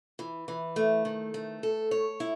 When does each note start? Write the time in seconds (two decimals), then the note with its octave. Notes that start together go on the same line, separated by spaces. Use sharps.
0.19 E3
0.48 E3
0.76 A3
1.05 D#3
1.34 A3
1.63 A4
1.91 C#5
2.20 E4